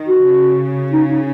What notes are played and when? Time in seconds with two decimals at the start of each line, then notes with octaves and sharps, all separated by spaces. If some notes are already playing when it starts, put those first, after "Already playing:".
Already playing: D#3
0.09 F#4
0.25 C#3
0.93 D#4
1.10 D#4